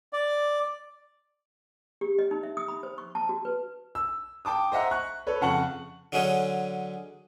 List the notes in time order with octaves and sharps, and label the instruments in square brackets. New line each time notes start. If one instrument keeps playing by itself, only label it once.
[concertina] D5
[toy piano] G4
D#5
D#4
E5
D#6
B5
C5
C#6
A5
F#4
B4
[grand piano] E6
G5 A5 D6 D#6
C5 D#5 E5 F#5 A#5
C#6 F#6
A4 B4 C#5
F2 C#3 F#5 A5 C#6 F#7
[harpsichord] D3 F#3 G#3 C#4 G#4